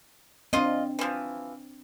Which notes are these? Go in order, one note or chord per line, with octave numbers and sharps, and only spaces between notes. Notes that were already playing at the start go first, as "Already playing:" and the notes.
C4 D4 F4 D#5
E3 F3